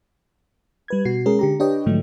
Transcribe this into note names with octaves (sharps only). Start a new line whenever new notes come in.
G3 B4 G#6
B2 F#4 C7
G#3 C#4 G#4 A#4
D3 G4 A#5
D4 G4 B4 C#5 D#5 G5
G#2 D3 F3 F#3 A3